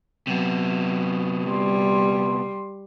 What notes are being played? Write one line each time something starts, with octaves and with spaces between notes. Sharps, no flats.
C3 F#3 B3
G3 C6